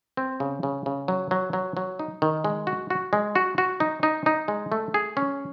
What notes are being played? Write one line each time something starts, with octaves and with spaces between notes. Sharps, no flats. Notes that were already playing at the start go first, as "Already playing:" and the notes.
C4
C#3
C#3
C#3
F#3
F#3
F#3
F#3
D#4
D#3
G#3
F#4
F#4
G#3
F#4
F#4
D#4
D#4
D#4
G#3
A3
G#4
C#4